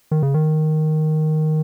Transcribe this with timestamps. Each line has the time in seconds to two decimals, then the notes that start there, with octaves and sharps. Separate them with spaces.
0.11 D#3
0.23 C#3
0.34 D#3